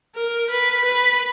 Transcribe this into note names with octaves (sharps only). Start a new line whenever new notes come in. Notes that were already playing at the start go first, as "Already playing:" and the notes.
A#4
B4
B4